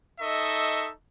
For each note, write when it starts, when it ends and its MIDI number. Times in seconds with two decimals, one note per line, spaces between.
0.20 0.91 63
0.20 0.91 69
0.20 0.91 75
0.20 0.91 76
0.20 0.91 85